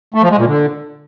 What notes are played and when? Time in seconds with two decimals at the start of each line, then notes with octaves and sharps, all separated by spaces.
0.14 A3
0.22 F3
0.31 G#3
0.39 A#2
0.47 D3